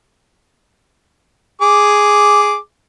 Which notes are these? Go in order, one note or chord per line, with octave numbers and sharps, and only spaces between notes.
G#4 D6